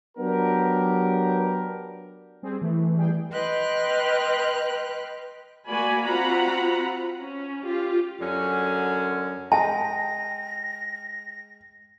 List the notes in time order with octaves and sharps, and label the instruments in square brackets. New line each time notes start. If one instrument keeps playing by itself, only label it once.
[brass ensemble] F#3 B3 D4 G4 A#4
[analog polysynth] G3 C4 G#4
[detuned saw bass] E3 [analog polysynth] A3
[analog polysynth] G3 G#4 G5
[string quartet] B4 D#5 G5 C6 F6 F#6
[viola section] A#3 F#4 D5 G#5 B5
C4 F4 F#4 F#5 A#5 B5
C#4
F4 G4
[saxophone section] F#2 D3 F#3 C#4
[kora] G#3 [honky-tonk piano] G5 [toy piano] A5 [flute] A#6